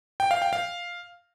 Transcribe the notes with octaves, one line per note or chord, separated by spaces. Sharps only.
G5
F5
G5
F5